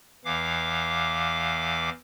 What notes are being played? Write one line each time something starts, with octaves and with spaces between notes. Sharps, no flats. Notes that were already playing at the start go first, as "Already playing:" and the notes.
E2 E3 F5 D6